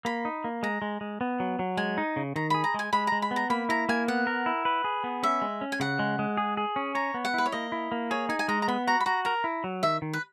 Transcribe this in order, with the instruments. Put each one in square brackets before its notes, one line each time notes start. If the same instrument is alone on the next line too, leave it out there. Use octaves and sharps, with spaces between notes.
[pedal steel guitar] A#3 [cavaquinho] B5
[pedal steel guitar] D#4
A#3
[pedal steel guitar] G#3 [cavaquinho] A#5
[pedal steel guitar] G#3
G#3
B3
F#3
F#3
[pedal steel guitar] G#3 [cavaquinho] G#5
[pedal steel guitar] D#4
C#3
[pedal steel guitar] D#3 [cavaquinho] A#5
[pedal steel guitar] G#4 [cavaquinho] B5
[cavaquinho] A#5
[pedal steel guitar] G#3 [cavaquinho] G#5
[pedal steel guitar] G#3 [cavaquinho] B5
[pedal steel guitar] G#3 [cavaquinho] A#5
[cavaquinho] B5
[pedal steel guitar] B3
[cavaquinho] A#5
[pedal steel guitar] A#3 [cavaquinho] B5
[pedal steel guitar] E4 [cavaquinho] A#5
[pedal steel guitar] A#3 [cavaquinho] G#5
[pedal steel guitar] B3 [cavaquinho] F#5
[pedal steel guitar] A#4
E4
B4
G#4
B3
[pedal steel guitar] C#4 [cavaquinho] E5
[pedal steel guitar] G#3
C#4
[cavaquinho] G#5
[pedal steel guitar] C#3 [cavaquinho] F#5
[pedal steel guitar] G#3
G#3
G#4
G#4
C#4
[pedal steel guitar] C#5 [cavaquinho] A#5
[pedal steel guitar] B3
[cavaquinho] F#5
[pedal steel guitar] E4 [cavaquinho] B4
[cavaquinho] C#5
[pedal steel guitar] A#3 [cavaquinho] D#5
[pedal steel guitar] E4
A#3
[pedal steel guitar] G#4 [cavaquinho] C#5
[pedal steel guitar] D#4 [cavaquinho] G#5
[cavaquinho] G#5
[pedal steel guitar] G#3 [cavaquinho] A#5
[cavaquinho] A#5
[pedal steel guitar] B3 [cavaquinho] B5
[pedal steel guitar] F#4 [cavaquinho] A#5
[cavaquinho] B5
[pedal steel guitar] F#4 [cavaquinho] A#5
[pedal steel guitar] A#4 [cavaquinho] A#5
[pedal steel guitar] E4
F#3
[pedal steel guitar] D#3 [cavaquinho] E5
[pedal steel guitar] D#3
[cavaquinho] B4